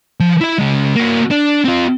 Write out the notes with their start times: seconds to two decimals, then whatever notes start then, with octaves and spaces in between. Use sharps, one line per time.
0.20 F3
0.41 E4 E5
0.58 C#3 G#3
0.96 A#3 F#4
1.31 D4
1.64 C4 F4